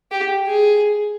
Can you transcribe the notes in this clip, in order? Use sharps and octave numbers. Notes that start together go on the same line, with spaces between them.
G4
G#4